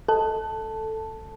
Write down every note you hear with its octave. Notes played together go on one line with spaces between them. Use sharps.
A4 A5